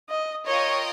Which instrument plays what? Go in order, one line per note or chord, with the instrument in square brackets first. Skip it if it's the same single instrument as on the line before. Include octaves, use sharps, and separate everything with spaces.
[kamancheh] D#5
[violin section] F4 A#4 D#5 G5 [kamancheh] C#5